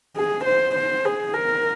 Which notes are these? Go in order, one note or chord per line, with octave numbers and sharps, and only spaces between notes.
G#4
C5
C5
G#4
A#4